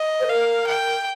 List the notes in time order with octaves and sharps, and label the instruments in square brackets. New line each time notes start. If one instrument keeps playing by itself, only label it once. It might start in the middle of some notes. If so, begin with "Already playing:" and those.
Already playing: [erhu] D#5
[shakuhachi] C5
[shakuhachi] A#4 [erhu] F5
[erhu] G5